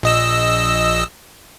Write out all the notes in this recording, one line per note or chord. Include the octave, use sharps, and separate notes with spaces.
A#1 D#5 E6